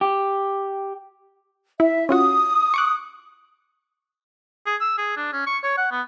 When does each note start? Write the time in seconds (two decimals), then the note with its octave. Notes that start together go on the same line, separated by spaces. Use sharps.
0.01 G4
1.80 E4 E5
2.09 C#4 F4 F#4 D#6
2.74 C#6 D6 F#6
4.66 G#4
4.81 E6
4.98 G#4
5.16 D4
5.33 C#4
5.46 C#6
5.63 C#5
5.77 F#5
5.91 B3